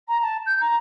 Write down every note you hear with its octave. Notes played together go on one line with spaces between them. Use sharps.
A#5
A5
G6
A#5